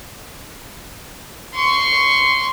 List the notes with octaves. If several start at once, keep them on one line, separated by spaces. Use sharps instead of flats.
C6 C#6